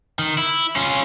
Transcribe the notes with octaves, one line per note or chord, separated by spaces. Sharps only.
D#3
E4
C#4 F4